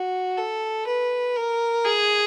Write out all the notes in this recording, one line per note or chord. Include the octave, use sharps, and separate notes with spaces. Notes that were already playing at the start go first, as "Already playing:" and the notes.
Already playing: F#4
A4
B4
A#4
G#4